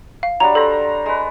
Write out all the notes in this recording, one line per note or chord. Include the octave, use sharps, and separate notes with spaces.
F5
F#3 G3 D4 A#5
A4 C5 A#5
G#3 B4